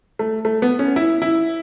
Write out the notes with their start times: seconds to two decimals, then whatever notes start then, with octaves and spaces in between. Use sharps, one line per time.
0.19 A3
0.45 A3
0.62 B3
0.79 C#4
0.96 E4
1.22 E4